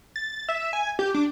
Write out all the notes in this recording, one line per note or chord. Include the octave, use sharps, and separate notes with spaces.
A6
E5
G#5
G4
D4